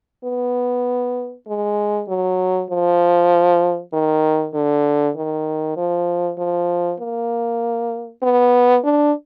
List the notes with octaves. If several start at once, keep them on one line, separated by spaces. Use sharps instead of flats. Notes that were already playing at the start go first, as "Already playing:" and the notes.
B3
G#3
F#3
F3
D#3
D3
D#3
F3
F3
A#3
B3
D4